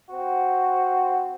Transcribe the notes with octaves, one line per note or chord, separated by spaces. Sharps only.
C4 F#4